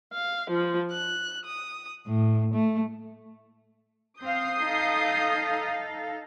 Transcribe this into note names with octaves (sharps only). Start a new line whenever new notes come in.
F5
F3
F#6
D#6
A2
A3
C4 F5 D#6 G6 C7
D#4 A4 F5